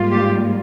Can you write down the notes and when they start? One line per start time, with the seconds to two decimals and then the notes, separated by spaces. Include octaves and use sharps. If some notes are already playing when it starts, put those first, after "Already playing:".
Already playing: G#2 G3 A#3 F4
0.11 G4